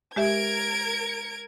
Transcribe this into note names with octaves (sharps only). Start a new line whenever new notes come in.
G#3 G4 A#4 E5 G#6 D7